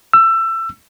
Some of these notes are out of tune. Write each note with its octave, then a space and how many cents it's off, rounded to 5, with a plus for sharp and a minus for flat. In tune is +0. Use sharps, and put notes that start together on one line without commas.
E6 +25